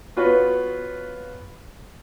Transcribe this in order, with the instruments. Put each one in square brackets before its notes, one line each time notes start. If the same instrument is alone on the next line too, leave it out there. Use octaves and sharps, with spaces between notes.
[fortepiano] B3 F4 F#4 B4 C#5